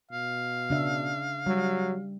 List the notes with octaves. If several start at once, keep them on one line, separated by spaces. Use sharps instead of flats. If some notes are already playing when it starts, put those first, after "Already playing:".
B2 F5
C#3 D4 E5
F#3 G3